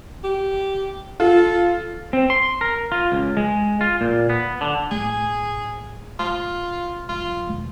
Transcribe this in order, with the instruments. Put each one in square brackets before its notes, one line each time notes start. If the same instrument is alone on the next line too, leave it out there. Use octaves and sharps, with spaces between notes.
[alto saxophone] G4
[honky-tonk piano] F4 [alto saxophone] A4
[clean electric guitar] C4
C6
A#4
F4
C#2
G#3
F4
A#2
B3
D3
[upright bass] A2 B3 [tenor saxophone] G#4
[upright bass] C#3 [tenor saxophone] F4
[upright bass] D#1 F#3 [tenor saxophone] F4
[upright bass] E1 D#3